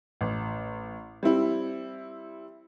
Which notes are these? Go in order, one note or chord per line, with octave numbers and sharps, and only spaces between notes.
A1
G3 C4 E4